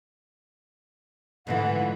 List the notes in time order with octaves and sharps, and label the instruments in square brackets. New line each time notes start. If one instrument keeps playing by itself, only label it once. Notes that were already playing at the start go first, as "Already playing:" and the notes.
[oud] G#2 D3 F4 [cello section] E3 [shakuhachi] F#5